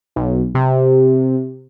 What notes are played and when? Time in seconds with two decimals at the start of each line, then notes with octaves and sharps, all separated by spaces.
0.16 B1
0.55 C3